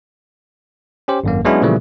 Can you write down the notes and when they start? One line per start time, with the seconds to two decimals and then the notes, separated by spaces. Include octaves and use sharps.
1.08 C#4 G4 C5
1.24 G#1 F#2 A#3
1.45 F#3 G#3 B3 C#4 D4 E4
1.62 A#2 C#3 E3 F3 G3 A3